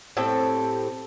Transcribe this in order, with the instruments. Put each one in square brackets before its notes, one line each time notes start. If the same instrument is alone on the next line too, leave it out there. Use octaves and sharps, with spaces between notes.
[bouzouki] A2 C4 G4 A4